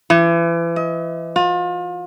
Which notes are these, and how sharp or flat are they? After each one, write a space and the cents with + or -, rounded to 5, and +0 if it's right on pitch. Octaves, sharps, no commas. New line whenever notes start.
E3 +35
D#5 +40
F4 +35